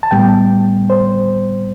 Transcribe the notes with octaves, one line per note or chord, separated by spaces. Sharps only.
A5
A2 G3 B3 G5
C5